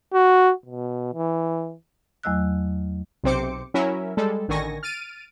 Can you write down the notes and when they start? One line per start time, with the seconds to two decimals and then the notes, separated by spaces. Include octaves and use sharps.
0.13 F#4
0.66 B2
1.14 E3
2.23 E2 F#3 A3 D#5 E6 F#6
3.24 B1 C3 C4 C5 D6 C#7
3.74 F#3 C#4 E4 A#4 E5
4.17 G3 G#3 A4
4.48 A1 D3 D#3 G#5 C#6 A#6
4.83 F6 A6 D7 D#7